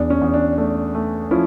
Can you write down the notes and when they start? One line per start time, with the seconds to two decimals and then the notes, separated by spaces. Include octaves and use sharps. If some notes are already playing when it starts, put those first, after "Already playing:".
Already playing: E2 D4
0.10 C#4
0.21 E2
0.34 D4
0.58 A3
0.95 A3
1.31 F3 C#4 E4